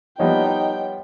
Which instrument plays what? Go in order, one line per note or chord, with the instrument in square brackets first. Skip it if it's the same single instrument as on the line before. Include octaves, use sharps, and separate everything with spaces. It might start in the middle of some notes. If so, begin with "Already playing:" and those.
[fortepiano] F3 G3 B3 [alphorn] D#4 [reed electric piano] C#5 D#5 F#5 [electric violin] G5